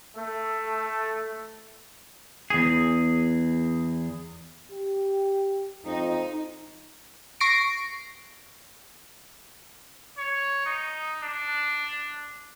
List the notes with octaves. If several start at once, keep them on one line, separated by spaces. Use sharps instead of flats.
A3
E2 G#4
G4
F2 D#4
C#6 A#6 C7 D7
C#5
D#4
D4